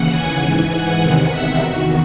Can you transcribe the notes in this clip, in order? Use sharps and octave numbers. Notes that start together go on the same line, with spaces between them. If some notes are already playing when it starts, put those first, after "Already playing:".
Already playing: D#2 C#3 E3 F#5
G#5
G#2 E3 G#5
F#5
E2 C3 D#3 F#5
E5
E2 D#3 F#4